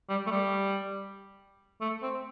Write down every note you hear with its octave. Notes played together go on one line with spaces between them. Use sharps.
G3
A3
G3
A3
C4